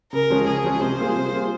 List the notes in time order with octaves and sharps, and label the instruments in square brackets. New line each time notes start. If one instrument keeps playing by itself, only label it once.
[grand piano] C#3 [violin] A#4
[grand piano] F3 G#3 C#4
[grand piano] C#3 [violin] G#4
[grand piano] F3 G#3 C#4
[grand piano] C3 [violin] C5
[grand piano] G3 A#3 F4 G#4
C3
G3 A#3 F4 G#4